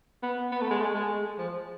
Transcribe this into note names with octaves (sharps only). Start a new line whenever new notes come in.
B3
B3
A3
G#3
A3
G#3
F3